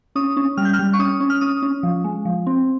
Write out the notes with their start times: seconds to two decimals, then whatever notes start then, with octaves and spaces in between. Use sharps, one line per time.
0.15 C#4 D#6
0.37 C#4
0.57 G3 F6
0.65 G6
0.73 F6
0.79 G3
0.93 C#6
0.99 C#4 D#6
1.20 C#4
1.30 F6
1.41 C#4 D#6
1.62 C#4
1.83 F3
2.04 G#3
2.25 F3
2.47 C4